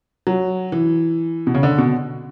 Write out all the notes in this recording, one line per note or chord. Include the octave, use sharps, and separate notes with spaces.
F#3
E3
B2
C#3
D3
B2